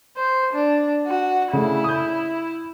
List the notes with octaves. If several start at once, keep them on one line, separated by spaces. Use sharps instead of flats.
C5
D4
F#4
C#3 A3 E4
D#6 G6